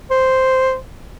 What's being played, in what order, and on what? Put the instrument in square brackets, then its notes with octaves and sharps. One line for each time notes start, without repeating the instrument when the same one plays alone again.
[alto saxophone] C5